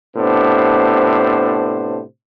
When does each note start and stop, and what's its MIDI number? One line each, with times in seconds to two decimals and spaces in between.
0.17 2.01 45
0.17 2.01 48
0.17 2.01 59
0.17 2.01 62
0.17 2.01 72